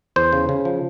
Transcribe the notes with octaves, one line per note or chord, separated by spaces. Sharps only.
E2 C5
C#3
C#3
F3